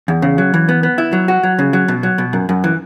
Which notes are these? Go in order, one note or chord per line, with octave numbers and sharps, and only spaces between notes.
E2
C#3
F#3
E3
B3
B3
E4
F#3
F#4
F#3
C#3
F#3
B2
F#3
B2
F#2
F#2
E3